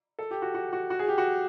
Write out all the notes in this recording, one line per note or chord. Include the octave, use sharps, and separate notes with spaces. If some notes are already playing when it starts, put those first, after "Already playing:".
A4
G4
F#4
F#4
F#4
F#4
G#4
G4
F#4